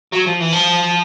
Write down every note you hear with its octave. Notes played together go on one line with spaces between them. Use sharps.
F#3
F3
E3
F3